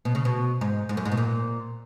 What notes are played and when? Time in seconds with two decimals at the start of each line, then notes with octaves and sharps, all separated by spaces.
0.05 B2
0.15 C#3
0.25 B2
0.61 G#2
0.89 G#2
0.97 F#2
1.05 G#2
1.12 B2
1.17 A#2